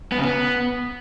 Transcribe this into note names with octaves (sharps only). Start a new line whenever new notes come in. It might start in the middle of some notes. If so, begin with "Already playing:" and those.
B3
C#3
B3